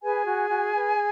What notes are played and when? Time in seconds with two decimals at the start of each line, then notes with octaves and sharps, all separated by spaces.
0.03 G#4 B4 G#5
0.26 F#4
0.49 F#4
0.73 B4